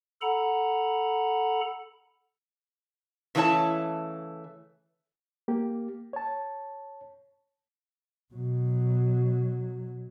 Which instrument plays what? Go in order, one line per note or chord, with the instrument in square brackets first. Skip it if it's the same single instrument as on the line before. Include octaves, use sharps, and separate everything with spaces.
[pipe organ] A4 F#5 A#5 B5
[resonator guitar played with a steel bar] C#3 E3 A3 E4 C#5 A5
[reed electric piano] A#3 G4
C#5 A5
[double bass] B2 F#3